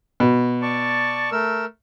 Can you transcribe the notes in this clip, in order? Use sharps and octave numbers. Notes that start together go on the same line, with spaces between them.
B2
D5 A5 C#6
A3 A#4 E6